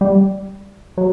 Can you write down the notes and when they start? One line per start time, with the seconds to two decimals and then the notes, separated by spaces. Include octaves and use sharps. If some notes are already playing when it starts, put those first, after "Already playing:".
0.01 G3
0.98 F#3